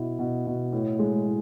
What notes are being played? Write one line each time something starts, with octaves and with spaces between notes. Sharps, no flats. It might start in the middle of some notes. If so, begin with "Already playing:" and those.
Already playing: B2 E4
B2
B2
A2
G#3
A2